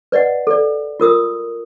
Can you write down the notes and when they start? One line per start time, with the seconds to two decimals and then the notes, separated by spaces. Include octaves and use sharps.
0.12 B4 D5 D#5 F#5
0.47 A4 D5
1.00 F4 A#4 D#6 E6